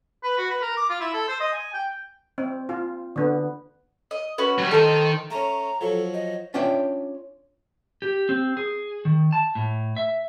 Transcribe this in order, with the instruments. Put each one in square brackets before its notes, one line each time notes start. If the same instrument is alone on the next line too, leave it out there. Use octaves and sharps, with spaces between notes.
[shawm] B4
F#4
B4
A#4
D6
F4
E4
A4
C5
D#5
G#5
G5
[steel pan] C4
F4
D3 B3
[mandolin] D#5
C#4 F#4 B4
[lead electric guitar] F#3 G3
[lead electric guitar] D#3 [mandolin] A4 C5
[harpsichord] A3 C#4 [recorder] A#5
[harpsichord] F3 F#3 [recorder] A4
[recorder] D#5
[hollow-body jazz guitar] C#4 D4 F4 C#5 E5 G5
[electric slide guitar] G4
C4
G#4
D#3
A5
A2
E5